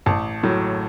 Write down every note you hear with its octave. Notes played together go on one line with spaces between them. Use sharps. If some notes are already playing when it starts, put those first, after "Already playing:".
A1 A5
A2 F#3